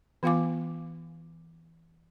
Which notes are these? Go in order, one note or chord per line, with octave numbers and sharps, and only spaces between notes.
E3 B3 F4 F5 G#5 D6